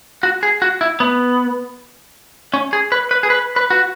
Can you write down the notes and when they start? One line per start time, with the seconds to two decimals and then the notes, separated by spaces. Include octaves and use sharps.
0.23 F#4
0.43 G#4
0.62 F#4
0.81 E4
1.00 B3
2.54 C#4
2.73 G#4
2.92 B4
3.11 B4
3.23 G#4
3.30 B4
3.56 B4
3.70 F#4